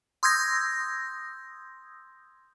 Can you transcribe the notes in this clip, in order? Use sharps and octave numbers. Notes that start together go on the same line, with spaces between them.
C6 D#6 E6 G6 G#6 A#6